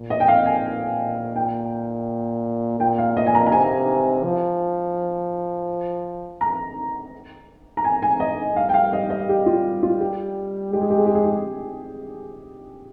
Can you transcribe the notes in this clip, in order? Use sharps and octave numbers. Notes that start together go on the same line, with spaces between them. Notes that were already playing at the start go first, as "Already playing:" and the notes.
Already playing: A#2
D#5
G5
F5
G#5
A#2 G5
A#2 G5
F5
D#5
G#5
A#5
A#5
C3 G#5
F3
A#5
A#5
G#5
G#5
D#5
G3 F5
G5
F5
D#5
D#5
G4
F4
F4
G4
G#3 G4
G#4
G4
G#4
G4
G#4
G4